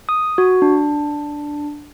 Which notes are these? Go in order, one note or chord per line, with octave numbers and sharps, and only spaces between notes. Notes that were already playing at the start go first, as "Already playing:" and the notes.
D#6
F#4
D4